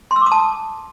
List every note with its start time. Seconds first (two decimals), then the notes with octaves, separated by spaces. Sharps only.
0.11 C6
0.16 E6
0.21 D6
0.26 D#6
0.32 A5